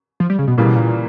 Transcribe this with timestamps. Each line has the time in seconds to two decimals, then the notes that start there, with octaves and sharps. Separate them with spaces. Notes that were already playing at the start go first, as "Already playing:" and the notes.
0.20 F3
0.30 G3
0.39 C#3
0.48 B2
0.58 A#2 C#3 E3 G3 A#3
0.66 B2
0.75 A#2